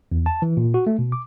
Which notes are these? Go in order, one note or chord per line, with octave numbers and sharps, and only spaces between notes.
E2
A5
E3
A#2
F#4
A3
B2
D6